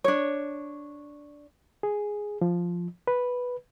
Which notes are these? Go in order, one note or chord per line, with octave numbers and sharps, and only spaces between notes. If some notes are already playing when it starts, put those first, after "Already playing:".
D4 C#5
G#4
F3
B4